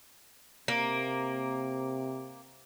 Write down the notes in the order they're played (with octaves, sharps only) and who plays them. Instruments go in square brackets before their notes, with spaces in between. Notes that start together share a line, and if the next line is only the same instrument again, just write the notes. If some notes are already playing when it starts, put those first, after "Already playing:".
[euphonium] C3 [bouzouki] A#3